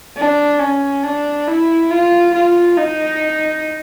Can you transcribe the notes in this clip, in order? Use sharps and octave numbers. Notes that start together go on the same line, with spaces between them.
D4
C#4
D4
E4
F4
F4
D#4